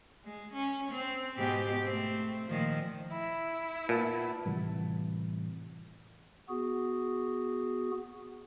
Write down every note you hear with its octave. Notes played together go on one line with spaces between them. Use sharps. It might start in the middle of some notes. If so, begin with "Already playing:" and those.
G#3
C#4
C4
G#2 B2 G4
A3 C4
A#2 D#3 F3
E4 B5
A#2 B3 B4 A5
A2 C3 E3 G3
B3 F#4 G#4